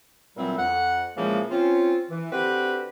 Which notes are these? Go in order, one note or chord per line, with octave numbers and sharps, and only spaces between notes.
A#2 D3 E3 F#3 G3 C4
F2 F#5
A#2 C#3 E3 F3 G#3 A#3
C4 C#4 F4
E3
D3 C4 F#4 G4 B4